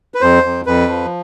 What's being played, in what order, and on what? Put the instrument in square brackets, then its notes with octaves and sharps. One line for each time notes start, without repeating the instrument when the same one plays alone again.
[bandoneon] B4
F2 C5
F2
F2 B4
F3